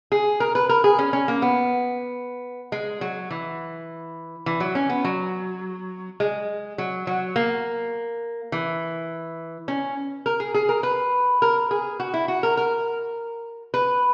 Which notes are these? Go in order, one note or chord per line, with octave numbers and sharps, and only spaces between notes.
G#4
A#4
B4
A#4
G#4
C#4
C#4
A#3
B3
G#3
F#3
E3
E3
F#3
C#4
B3
F#3
G#3
F#3
F#3
A#3
E3
C#4
A#4
G#4
G#4
A#4
B4
A#4
G#4
F#4
E4
F#4
A#4
A#4
B4